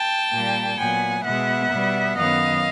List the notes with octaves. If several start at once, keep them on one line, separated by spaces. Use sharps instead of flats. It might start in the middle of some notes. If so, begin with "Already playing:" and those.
Already playing: G5 A5
A#2 G3 A#3
A#2 F#3 B3 F#5 G#5
B2 G#3 B3 E5 F#5
B2 G3 B3
F#2 D#3 F#3 B3 D#5 F5